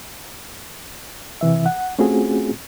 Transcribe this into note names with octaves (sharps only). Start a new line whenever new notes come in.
C3 E3 E5
F#5
A3 C4 C#4 F4 F#4 G#4